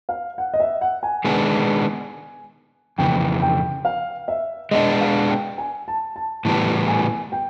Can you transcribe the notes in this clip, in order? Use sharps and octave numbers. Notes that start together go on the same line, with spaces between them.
F5
F#5
D#5
E5
F#5
G#5
D#3 G#3 B3 D4
F2 C#3 E3 G5
G5
F5
E5
G#3 B3 D4 D#5
F5
G5
G#5
A5
A5
A2 E3 G3 B3 A5
G#5
G5